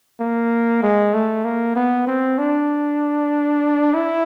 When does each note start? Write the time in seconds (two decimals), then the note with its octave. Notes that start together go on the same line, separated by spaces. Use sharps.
0.20 A#3
0.83 G#3
1.14 A3
1.45 A#3
1.76 B3
2.07 C4
2.38 D4
3.94 E4